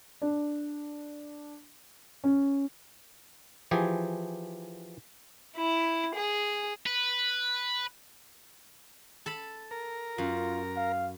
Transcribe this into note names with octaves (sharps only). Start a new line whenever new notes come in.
D4
C#4
E3 F3 G4 G#4
E4
G#4
B4
A4 A5 B5
A#4
F#2 F4
F5